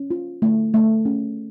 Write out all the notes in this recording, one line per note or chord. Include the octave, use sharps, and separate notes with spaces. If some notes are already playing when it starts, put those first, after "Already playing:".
Already playing: C#4
F4
A3
A3
C#4